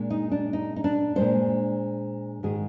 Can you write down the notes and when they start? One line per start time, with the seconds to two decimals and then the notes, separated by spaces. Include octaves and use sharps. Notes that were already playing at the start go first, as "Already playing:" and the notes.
Already playing: A#2 G#3 D4
0.10 D#4
0.32 D4
0.53 D#4
0.76 D#4
0.84 D4
1.16 A#2 G#3 D4 C5
2.43 G#2 D#3 G#3 G#4